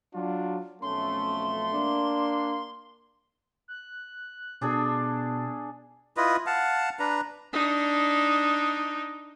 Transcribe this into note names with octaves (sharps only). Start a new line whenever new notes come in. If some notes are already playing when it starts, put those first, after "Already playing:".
F#3 D4 F4
B1 F2 A3 C#4 C6
A#3 D4
F#6
B2 D4 G#4 A4
E4 F4 B4 D#5
F5 F#5 A5
D4 B4 A#5
D4 D#4